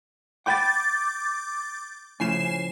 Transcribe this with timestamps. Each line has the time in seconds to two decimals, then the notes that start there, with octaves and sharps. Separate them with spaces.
0.46 F#5 G5 B5 D6 G6 A6
2.20 A2 C#3 F3 G#5 C7 E7